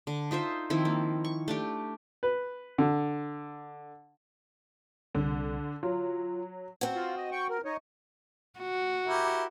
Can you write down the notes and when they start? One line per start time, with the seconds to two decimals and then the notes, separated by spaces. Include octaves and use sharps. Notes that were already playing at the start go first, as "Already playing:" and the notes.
0.07 D3
0.31 D#4 F4 C5 E5
0.70 D#3 F3 C4 E4
0.85 A#3
1.25 C#6
1.48 A3 D4 G4
2.23 B4
2.78 D3
5.15 C2 D3
5.83 F#3 F4
6.81 C4 F#4
6.95 F4
7.17 D#5
7.32 G5 C#6
7.50 A#4
7.65 D#4 C#5 D#5
8.60 F#4
9.07 E4 G4 A#4